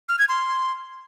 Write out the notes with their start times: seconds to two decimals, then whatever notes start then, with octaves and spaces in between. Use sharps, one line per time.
0.09 F6
0.19 G#6
0.29 C6